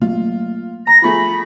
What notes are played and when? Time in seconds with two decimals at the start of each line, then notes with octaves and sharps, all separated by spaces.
0.01 F#3 A3 A#3 F4
0.87 A#5 A#6
1.02 F3 A3 G#4 B5